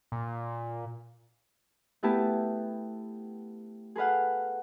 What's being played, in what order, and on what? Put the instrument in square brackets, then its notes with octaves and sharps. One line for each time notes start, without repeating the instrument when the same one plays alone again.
[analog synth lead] A#2
[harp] A3 B3 E4 G4 B4 A5
G#4 A4 B4 F5 F#5